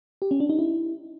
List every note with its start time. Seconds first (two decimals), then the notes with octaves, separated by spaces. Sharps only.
0.22 G4
0.31 C#4
0.40 D4
0.49 D#4
0.59 E4